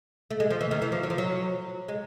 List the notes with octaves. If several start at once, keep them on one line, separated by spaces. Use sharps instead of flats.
A3
G#3
F3
E3
D#3
E3
F3
F#3
F3
F#3
G#3